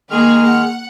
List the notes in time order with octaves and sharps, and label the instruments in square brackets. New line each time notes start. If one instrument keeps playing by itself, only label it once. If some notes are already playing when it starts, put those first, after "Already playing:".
[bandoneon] D#3 G#3 F6 [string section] A#3 G#4
[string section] F#5